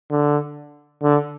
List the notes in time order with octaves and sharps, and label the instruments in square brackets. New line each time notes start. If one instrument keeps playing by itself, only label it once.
[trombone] D3
D3